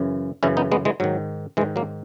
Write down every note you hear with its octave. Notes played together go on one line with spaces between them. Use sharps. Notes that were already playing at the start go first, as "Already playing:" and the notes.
Already playing: F#2 C#3 E3
F#2 C#3 E3 C#4 E4
B3 D#4
G#3 B3
E3 G#3
G#2 D#3 F#3
G#2 D#3 E3 G#3
F#3 A#3